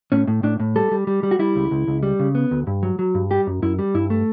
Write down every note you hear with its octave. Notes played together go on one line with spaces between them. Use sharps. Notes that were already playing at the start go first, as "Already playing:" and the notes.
A2 C#4
A2
A2 D4
A2
G3 A4
G3
G3
G3
F#4
G3 E4
C#2
C#2
C#2
G3
C#3
B3
D2
G2
F#3
F#3
G2
G3 G4
F#2
F#2 E4
G3
G2 E4
A3